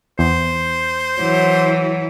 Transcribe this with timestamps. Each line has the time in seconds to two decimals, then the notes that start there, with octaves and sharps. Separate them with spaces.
0.19 E2 C5
1.21 E3 F#3